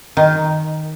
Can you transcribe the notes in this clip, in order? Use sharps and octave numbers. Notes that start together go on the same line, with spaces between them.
D#3